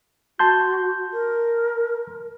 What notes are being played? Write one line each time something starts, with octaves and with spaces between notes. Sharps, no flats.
F#4 A5 C6 G6
A#4